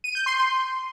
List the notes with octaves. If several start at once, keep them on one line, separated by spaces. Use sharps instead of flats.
D#7
G6
C6
C6